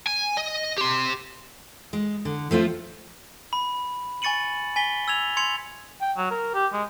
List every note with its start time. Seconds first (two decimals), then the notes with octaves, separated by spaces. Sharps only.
0.07 G#5
0.38 D#5
0.78 G4 C6
1.93 G#3
2.25 D3
2.51 F3 A3 C4 F4
3.53 B5
4.22 G#5 C#6 A6 C#7 D#7 F#7
4.76 G#5 B6 G7
5.08 E6 G#6 F7
5.37 C6 G#6 C#7 F7
6.01 G5
6.17 F#3
6.31 A#4
6.54 G4
6.73 G#3